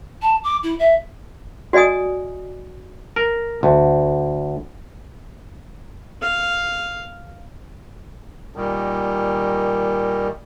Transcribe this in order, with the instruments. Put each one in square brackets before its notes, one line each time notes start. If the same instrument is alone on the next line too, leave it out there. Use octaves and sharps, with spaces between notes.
[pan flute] A5
D6
E4
E5
[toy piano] F#4 D5 D#5 G#5 D#6
[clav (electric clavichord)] A#4
D2
[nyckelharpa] F5
[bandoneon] A#2 D#3 G3